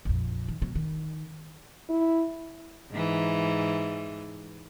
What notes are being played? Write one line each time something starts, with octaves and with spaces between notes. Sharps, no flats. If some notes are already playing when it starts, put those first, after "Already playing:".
A#1 F2
D#3
B2 F#3
D#3
E4
G#2 E3